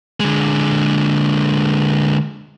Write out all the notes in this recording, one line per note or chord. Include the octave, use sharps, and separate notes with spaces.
D3 G#3